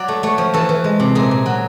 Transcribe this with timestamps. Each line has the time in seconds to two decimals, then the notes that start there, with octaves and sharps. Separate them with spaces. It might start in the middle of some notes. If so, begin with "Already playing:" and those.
Already playing: F#3 D5
0.08 A3
0.23 A3 C#5
0.38 F3
0.54 E3 A4
0.69 E3
0.84 G#3
1.00 C3
1.15 A#2 G#4
1.31 A#2
1.46 F#3